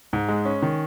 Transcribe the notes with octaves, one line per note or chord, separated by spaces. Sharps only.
G#2
G#3
C#4
D#3